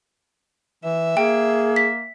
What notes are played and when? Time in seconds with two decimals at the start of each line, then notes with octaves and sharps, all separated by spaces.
0.84 E3 E5
1.17 A#3 G#4 G5
1.76 B6